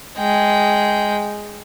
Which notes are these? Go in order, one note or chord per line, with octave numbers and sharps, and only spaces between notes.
G#3 G5